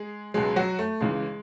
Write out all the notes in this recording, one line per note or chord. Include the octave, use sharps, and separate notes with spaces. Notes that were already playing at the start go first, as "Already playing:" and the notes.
Already playing: G#3 G#4
C#2 B2 F#3 G#3 G#4
F#3 F#4
A3
C#2 C#3 E3 G#3